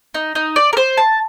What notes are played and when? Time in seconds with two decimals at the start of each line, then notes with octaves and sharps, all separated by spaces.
0.14 D#4
0.35 D#4
0.56 D5
0.73 A#4
0.77 C5
0.97 A5